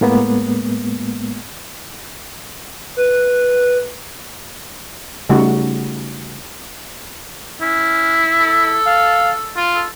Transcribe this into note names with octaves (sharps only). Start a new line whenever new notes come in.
A2 G#3 A#3 B3
B4
C#3 G3 A3 D#4 F#4
C#4 E4
A4
F5
F4
A4